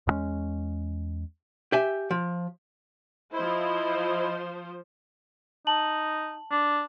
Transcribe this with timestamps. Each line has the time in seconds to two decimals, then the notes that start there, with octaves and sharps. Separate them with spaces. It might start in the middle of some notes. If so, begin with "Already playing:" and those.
0.07 E2 G2 G#3 C#4
1.72 G4 E5 G#5
2.11 F3
3.33 F3 E4 C5 D#5
5.67 D#4 A5 F#7
6.52 D4